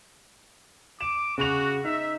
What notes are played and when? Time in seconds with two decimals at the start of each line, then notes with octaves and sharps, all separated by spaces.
1.01 D6 E7
1.38 C#3 F#4 F7
1.84 D#4 E5